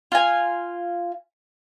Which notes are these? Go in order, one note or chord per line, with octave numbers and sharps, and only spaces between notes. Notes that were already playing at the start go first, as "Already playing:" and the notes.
F4 G#5